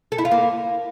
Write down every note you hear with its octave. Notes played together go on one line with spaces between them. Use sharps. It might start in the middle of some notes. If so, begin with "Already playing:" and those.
A4
E4
F4
A#3